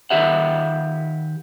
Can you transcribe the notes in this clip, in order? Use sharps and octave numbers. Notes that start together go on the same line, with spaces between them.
D#3 G4 E5 F#5